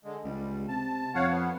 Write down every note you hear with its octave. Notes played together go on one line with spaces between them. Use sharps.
D3 G#3
C#2 G3
C3 A5
F2 C#5 F5 F#5
B3